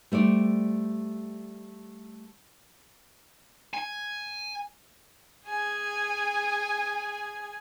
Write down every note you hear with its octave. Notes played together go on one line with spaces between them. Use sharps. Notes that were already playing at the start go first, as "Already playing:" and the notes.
G3 A3 C5 D5
G#5
G#4 G#5